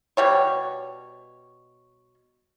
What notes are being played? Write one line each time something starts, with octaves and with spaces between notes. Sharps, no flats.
B2 G3 C#5